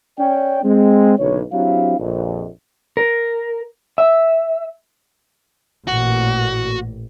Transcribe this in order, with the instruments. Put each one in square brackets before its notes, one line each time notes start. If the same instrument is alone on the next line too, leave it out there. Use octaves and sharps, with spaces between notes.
[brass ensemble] C#4 D5 G5
G#3 C4
F#1 B1 D3 C#5
F#3 C4 D4 E4 G4 F5
A#1 F2
[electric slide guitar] A#4
E5
[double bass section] A1 A#2 [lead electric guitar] F#4